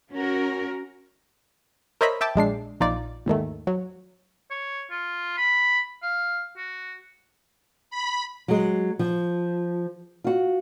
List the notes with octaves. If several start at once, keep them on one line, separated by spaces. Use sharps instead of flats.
C#4 F#4 A#4
A#4 C5 C#5 D#5 E5 B5
E5 G5 A5 D6
A#1 G#3 D4 C7
A#1 D#4 F4 D5
D#2 G#2 D#3 A3
F#3
C#5
F4
B5
F5
F#4
B5
F#3 G#3
F3
F4 F#4